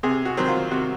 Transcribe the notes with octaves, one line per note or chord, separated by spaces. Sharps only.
C3 G#4
F#4
D#3 F#3 C4
F4
C3 F#4